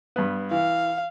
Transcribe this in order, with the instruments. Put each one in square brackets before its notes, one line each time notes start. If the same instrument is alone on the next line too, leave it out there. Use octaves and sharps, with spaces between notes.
[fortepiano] G2 B3
[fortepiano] E3 [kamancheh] F5